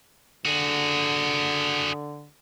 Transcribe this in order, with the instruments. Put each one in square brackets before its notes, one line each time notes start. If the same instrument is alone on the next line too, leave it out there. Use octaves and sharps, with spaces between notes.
[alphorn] D3 [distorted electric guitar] F#4 G#4